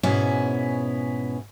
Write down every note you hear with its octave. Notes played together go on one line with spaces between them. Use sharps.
G#2 B2 B3 C#4 E4